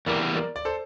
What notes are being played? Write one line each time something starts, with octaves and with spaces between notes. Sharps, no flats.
E2 E3 G3 A#3 A#4 D5
A#4 D5
D5
A4 C5